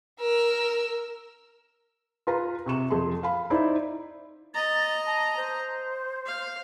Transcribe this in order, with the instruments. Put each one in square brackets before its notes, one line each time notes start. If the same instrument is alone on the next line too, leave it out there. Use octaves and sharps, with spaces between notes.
[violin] A#4 E6
[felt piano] F4 B4 A#5
C3 C#6 E7
F2 C6
F5 B5
D#4 E4 C5 D5 B5
[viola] D#5 A#5 [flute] A6
[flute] A5
C5
[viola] F5